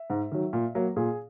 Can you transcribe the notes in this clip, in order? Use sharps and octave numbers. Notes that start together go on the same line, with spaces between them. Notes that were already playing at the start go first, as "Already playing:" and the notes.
Already playing: E5
G#2
D#3 F#3
A#2
F#3 A#3
A#2 G#4